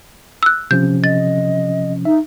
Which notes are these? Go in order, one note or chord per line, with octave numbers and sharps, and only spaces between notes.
E6 F#6
C3 F3 C#4 G6
D#5 A6
D#4 E5